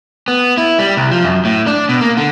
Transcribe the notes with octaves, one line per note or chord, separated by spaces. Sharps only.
B3
E4
G3
C2
F3
F#2
A2
D4
B2
A#3
D3